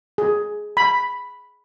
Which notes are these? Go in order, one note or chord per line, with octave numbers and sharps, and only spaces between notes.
G#4
B5